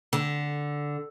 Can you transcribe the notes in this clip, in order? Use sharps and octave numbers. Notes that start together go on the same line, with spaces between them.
D3